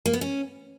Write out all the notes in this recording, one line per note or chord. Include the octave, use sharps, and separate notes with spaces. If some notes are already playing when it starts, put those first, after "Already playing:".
A#3
B3
C#4